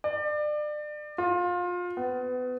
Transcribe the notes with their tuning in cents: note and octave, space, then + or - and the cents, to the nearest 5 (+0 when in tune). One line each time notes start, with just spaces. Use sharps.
D5 +30
F4 +25
B3 +30